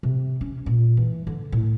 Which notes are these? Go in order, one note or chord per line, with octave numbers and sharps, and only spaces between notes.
C3
C#4
A#2
E3
D3
A2